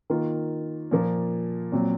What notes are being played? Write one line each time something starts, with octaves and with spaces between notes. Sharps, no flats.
D#3 A#3 F4
A#2 F3 A#3
A#2 F#3 C4